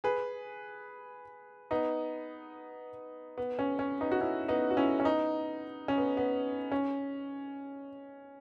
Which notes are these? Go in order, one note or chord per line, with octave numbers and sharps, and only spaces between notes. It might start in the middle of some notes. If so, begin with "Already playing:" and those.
G#4 B4
B3 D#4
B3
C#4
C#4
B3 D#4
F#4
C#4 E4
B3 D#4
F#4
C#4 E4
C#4
B3 D#4
C#4
B3
B3
C#4